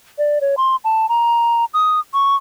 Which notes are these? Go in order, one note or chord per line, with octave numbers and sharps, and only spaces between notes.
D5
C#5
C6
A5
A#5
D#6
C#6